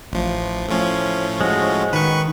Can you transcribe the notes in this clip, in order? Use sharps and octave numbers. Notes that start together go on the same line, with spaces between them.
A1 F3
A2 F3 C#4
G#3 F#4
D#3 B4 C#6